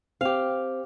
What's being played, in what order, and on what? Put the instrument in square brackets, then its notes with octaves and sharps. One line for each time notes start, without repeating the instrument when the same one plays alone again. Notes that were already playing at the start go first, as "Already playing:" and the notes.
[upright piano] C4 [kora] G4 F5